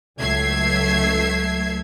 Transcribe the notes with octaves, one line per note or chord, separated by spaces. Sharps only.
C#2 F#3 A3 E5 G#6 C7